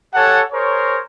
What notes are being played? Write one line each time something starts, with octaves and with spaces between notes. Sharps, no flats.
G4 A4 C#5 F#5 G#5 A5
G#4 A#4 C5 C#5